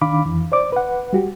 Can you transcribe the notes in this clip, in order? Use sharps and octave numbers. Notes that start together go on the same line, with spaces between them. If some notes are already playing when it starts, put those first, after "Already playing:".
D#3 D4 F5 B5 D6
F2 E3
C5 D5 D6
B4 F#5
G3 F#4 G4